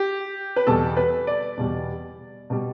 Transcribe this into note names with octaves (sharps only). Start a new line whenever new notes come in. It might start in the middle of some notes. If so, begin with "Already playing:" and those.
Already playing: G4
B4
E2 B2 G3 A4
B4
D5
E2 B2 G3
B2 G3